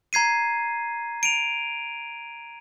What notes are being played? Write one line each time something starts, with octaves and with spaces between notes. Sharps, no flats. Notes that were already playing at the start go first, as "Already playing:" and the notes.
A#5 G#6 C7 D#7
D7 D#7 F7